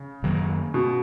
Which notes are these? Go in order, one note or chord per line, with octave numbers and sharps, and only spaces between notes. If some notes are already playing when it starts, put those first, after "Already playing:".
Already playing: C#3
F#2 D#3 F#3 A#3
B2